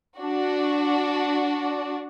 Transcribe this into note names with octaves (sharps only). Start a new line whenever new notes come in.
D4 F#4